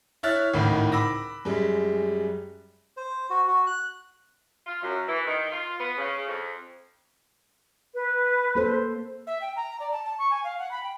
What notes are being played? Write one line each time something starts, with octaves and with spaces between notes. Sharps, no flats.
E4 C#5 E5 F6 F#6 A6
G#1 C#2 A2 D#3
B5 D6 E6 A#6
F#2 G3 G#3
C5
F#4
F#4
F#6
F4
F#2
E3
D#3
F4
B3
C#3
F2
B4
A#3 A4 C5
E5
G5
A#5
D5
A5
A5
C#6
G#5
F5
F#5
B5
G5